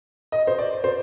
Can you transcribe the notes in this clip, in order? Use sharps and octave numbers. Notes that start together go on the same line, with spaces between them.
D#5
C5
D5
C5